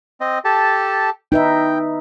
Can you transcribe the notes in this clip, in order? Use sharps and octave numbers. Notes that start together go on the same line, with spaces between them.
C4 D#5
G4 A4 A5
D#4 B4 E5 G5